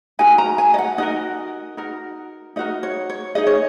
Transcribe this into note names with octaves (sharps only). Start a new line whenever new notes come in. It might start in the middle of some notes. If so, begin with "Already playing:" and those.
D#4 F#4 A#4 G#5
A#5
G#5
D#5
F#5
D#4 F#4 A#4 D#5
D#4 F#4 A#4
D#4 F#4 A#4 D#5
C#5
C#5
D#4 G#4 D#5
C#5